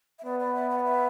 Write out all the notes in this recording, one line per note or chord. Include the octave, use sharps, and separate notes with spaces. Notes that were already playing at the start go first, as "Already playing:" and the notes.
E5
B3 D5
D5
E5
F#5
D5
E5